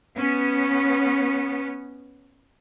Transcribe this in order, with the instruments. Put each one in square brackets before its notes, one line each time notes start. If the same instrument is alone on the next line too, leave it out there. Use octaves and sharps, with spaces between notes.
[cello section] B3 C#4